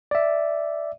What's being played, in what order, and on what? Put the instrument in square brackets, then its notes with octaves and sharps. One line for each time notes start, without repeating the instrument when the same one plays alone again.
[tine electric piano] D5 E5